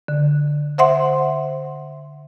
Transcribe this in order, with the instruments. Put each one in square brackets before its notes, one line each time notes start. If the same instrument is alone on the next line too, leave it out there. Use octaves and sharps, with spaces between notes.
[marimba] D3
C5 E5 F#5 C6